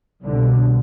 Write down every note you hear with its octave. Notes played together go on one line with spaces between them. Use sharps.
C2 B2 D3